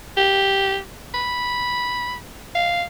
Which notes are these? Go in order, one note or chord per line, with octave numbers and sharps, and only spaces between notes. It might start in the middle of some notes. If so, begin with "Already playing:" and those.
G4
B5
F5